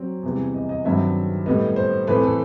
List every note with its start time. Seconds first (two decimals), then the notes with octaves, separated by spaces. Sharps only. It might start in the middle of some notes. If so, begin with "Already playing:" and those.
Already playing: F#3 C4
0.23 E2 C3 E3 G3
0.54 D#5
0.69 D#5
0.84 G2 D#3 F#3 C4 E5
1.46 A2 G3 B3 D#5
1.76 C5
2.07 A2 E3 A3 C4 B4
2.24 A4